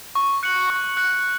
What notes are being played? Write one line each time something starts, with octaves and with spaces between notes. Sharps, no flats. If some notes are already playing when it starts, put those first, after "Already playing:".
C#6
F#6 C#7 F#7
C#6
F#6 C#7 F#7